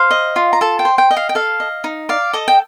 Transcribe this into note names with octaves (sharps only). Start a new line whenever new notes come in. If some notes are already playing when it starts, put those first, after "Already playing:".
Already playing: C5 F5
D#5
F4
A#5
A4 A5
G5
C5
G5
D#5
F5
G5
A4 F5
D#5
D#4
D5 F5
A4 D#5
G5